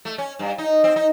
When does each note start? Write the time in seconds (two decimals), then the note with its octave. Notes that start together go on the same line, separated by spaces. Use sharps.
0.05 A3
0.18 C#4
0.39 G2
0.58 D#4
0.84 C4
0.96 D#4